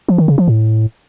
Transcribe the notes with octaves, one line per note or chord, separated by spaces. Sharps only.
F3
D#3
C#3
F3
A2